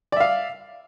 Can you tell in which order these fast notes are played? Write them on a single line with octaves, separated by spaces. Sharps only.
D5 E5 F5